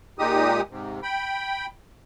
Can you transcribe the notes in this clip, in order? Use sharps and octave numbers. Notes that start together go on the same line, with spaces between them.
A#2 G#3 D#4 G4 D#6
G#2 C3
G5 B5